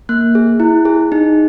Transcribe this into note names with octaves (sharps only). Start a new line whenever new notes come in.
A#3 F#6
G#4
E4
G#4
D#4